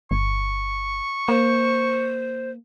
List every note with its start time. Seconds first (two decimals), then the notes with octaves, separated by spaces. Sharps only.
0.11 G1 C#6
1.28 A#3 C5